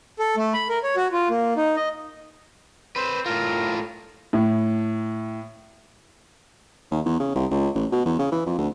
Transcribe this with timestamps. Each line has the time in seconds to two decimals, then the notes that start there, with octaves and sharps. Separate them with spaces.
0.19 A4
0.37 A3
0.53 B5
0.69 A#4
0.83 C#5
0.96 F#4
1.13 F4
1.29 A#3
1.57 D#4
1.76 D#5
2.96 C4 B4 C5
3.26 A2 F4 A#4
4.33 A2
6.91 D#2
7.06 E2
7.20 C#3
7.36 C2
7.51 C#2
7.75 A1
7.92 B2
8.06 E2
8.19 C#3
8.32 E3
8.46 F2
8.58 D2